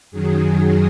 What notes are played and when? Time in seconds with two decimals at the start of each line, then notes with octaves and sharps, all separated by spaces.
0.11 F#2 D#3 F#3 G#4
0.59 G#4